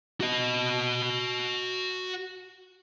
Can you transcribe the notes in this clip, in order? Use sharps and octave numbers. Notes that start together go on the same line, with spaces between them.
F#4 D#5